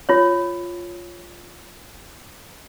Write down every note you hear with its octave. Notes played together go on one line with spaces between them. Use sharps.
F4 C#5